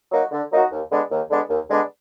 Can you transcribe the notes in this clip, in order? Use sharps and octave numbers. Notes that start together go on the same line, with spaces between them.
F#3 A#3 D#4 F#4
D3
F#3 A#3 D#4 F#4
D#2
D3 G#3 B3 D4
D#2
D3 G#3 B3 D4
D#2
D3 G#3 B3 D4